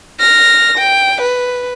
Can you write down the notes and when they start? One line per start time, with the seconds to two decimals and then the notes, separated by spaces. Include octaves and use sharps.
0.20 F6 A#6
0.78 G5
1.21 B4